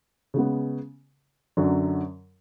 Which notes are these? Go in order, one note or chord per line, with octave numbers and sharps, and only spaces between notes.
C#3 G#3 B3
F#2 D3 F#3